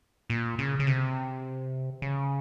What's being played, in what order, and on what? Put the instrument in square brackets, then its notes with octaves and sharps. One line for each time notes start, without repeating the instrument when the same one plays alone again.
[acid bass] A#2
C#3
C#3
C3
C#3